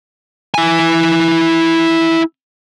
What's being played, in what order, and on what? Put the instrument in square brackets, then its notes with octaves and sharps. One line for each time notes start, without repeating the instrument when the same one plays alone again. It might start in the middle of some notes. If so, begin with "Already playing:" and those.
[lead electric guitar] E4 G#5